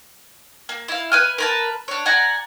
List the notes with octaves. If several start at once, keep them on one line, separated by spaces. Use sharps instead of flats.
A#3
E4 F5
B4 G#5 F6
A#4 B4 A5
D4 C#5
D5 F#5 G#5 A#5